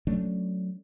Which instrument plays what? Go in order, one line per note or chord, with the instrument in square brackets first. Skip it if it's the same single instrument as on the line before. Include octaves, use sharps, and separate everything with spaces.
[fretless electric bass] F#3 A3 C#4 D4